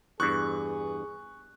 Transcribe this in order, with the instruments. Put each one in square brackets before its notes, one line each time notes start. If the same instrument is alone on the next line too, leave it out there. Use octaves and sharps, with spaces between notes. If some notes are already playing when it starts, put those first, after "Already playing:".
[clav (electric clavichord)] E2 G2 [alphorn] G#4 [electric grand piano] C#6 F#6